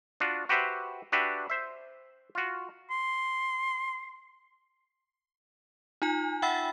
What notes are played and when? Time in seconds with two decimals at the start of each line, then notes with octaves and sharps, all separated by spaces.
0.20 D4 F4 F#4
0.49 F#4 G4 B4 C5 E5 F#5
1.12 D4 F#4 G4 B4 E5
1.50 C5 E5
2.35 F4 F#4
2.91 C6
6.02 D#4 F4 G#5
6.42 E5 F#5 G5 B5 E6 A6